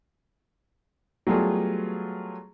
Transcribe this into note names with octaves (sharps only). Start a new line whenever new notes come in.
F#3 G3 A3 B3 F4 G#4